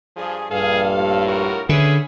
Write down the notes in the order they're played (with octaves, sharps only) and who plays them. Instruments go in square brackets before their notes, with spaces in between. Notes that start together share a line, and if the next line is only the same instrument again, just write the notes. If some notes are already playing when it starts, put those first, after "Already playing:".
[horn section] G2 G#4 [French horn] F3
[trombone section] A#1 G2 [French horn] G#4 [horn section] A4 F5
[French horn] A2
[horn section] F4 F#4 A#4
[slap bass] D3 [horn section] C#4 B4 E5 [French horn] G#4